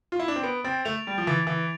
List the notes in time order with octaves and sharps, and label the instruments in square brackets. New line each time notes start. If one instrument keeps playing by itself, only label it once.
[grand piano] F4
E4
D4
C4
[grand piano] B3 [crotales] D7
[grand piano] C4 [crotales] A6
[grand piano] A3 [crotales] F7
[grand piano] G3 [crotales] D7
[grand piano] F3
[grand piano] E3 [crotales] A6
[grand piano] E3 [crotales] A6